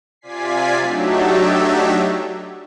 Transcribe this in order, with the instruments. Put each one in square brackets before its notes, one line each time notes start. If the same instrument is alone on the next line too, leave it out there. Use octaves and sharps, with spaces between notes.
[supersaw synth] C3 F4 D5 G#5 B6 C7
F#3 A3 D4 D#4 G4 E5